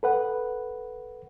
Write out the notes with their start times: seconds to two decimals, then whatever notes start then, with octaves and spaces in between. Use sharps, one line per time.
0.03 A4 B4 F#5